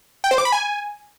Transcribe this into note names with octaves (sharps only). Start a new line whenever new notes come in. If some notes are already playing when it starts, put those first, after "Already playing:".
G5
C5
D6
B5
G#5